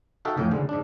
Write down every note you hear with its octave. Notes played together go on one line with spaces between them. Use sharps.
D#4 F#4 A4 E5 F5 G5
A1 F2 A2 F5 G5
C#2 G#2 D3 G#3
G#2 D4